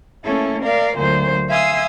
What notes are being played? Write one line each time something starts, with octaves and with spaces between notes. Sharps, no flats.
A3 A#3 C#4 E4 A4
A#4 D5 F5
D2 A#2 D3 F#3 C5
E5 F5 G#5 C6 D#6 E6